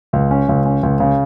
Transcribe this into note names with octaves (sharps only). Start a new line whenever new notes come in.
C#2
C#4
C#2
C#4
C#2
C#3